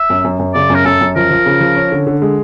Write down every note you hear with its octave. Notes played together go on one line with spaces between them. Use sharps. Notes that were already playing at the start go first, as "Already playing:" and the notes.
Already playing: E5
F#2
F#2
F#2
C#3 D5
F#2
A#4
F#2 A4
F#2
F3 A#4
F3
C#3
F3
C#4
D3
D3
G#3